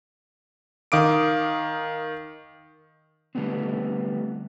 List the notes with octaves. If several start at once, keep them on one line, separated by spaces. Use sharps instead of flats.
D#3 F5 D6 D#6 D7
D3 G3 A3 B3 C4